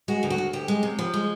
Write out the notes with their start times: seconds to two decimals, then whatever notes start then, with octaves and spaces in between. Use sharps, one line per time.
0.08 G#3 F#4
0.23 D2
0.30 F#4
0.38 D2
0.53 D2 G4
0.68 G#3
0.83 C3
0.99 F3
1.14 G#3